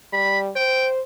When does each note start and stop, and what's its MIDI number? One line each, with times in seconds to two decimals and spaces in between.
0.13 0.50 55
0.13 0.39 83
0.56 1.01 72
0.56 0.88 79